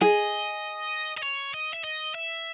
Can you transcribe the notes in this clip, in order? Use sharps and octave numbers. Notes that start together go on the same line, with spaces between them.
G#4 D#5
D#5
C#5
D#5
E5
D#5
E5